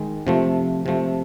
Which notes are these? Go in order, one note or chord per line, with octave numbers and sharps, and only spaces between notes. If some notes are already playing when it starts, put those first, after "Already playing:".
Already playing: D#3 G#3
C3 F3 A3
C3 F3 A3